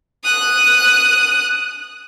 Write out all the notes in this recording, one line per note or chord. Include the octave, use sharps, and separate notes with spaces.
D#6 F#6